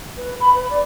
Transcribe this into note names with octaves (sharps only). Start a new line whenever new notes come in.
B4
B5
B4
D5